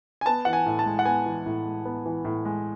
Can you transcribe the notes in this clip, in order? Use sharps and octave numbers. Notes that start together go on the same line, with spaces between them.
G#5
B3 A5
E3 F#5
G#5
A2
A5
G#3
F#5
B3 G#5
E3
A2
G#3
B3
E3
A2
G#3